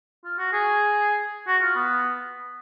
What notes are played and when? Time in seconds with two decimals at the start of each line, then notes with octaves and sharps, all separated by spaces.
0.25 F4
0.38 F#4
0.52 G#4
1.48 F#4
1.62 F4
1.76 B3